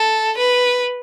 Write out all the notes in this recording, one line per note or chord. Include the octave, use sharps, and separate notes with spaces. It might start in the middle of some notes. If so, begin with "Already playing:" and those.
Already playing: A4
B4